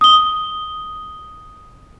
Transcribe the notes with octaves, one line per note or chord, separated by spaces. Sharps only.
D#6 G7